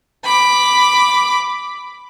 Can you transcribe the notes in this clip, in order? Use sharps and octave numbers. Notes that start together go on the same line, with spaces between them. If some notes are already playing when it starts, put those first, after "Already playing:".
B5 D6